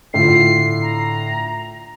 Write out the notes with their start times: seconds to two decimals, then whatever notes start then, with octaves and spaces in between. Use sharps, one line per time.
0.14 A2 D3 F4 C7
0.82 A#5